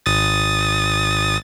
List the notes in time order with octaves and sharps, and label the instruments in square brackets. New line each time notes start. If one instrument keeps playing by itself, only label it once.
[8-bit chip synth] G#1 D#6 A6